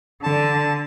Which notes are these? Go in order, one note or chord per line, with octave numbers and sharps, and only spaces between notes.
D3 A5